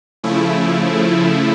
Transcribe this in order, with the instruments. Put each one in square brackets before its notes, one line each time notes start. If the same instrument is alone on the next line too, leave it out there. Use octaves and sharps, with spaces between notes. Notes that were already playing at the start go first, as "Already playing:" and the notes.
[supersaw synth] C#3 F3 A3 E4